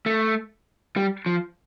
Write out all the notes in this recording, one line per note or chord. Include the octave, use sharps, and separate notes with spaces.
A3
G3
F3